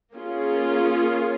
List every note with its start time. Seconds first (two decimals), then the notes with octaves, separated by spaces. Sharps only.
0.13 A#3 C#4 F4 G#4